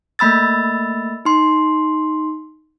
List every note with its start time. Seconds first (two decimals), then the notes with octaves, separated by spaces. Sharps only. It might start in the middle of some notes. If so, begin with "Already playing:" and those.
0.19 A3 A#3 B5 E6 A6
1.25 D#4 C6